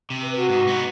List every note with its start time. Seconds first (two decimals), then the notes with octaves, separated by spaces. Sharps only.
0.10 C3
0.22 B4
0.36 F#4
0.49 G#2
0.67 B3 D#4